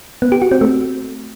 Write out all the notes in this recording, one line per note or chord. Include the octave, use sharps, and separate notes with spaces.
B3
G4
F#4
C4
A3